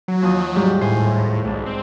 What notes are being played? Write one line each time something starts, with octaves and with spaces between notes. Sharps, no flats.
F#3
D#2 F3 D#6
G#2 G3 G4
A2 C5 G#5
B1 G#2 D4
C4